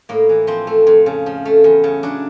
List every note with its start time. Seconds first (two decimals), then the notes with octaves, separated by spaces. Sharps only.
0.09 A2 A#3
0.29 E3
0.47 F3 C4
0.67 A3
0.87 F2
1.06 C#3
1.26 F3
1.45 A3
1.64 E2
1.84 C#3
2.03 F#3 D4